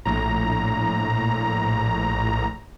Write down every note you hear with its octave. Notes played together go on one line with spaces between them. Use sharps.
A#1 A2 A#5